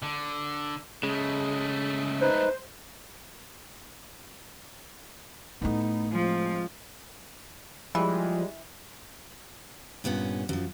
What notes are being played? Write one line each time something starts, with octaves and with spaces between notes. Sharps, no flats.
D3
C#3 G#3 A3
D#4 B4 C5
A2 A3 B3 D#4
F3 G#3 C4
E3 F3 G3 G#3
G2 A#2 B3 C#4
F#2 F3